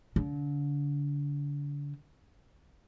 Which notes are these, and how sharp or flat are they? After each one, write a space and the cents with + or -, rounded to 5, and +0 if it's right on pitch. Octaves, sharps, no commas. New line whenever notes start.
D3 -35